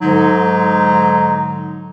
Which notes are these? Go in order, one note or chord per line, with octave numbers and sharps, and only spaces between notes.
G#2 D3 F#3 G#3 D#4